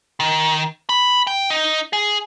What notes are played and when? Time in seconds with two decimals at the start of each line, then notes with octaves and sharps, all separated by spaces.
0.20 D#3
0.89 B5
1.27 G5
1.50 D#4
1.93 G#4